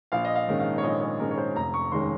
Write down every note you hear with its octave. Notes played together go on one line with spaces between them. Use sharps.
A#1 F5
D#5
F5
G#2 D#3 G#3 C#4
F5
C#5
A#1 D#5
C#5
G#2 D#3 G#3 C#4 A#4
C#5
C5
F1 A#5
C#6
D#2 D#3 G#3 C#4 C6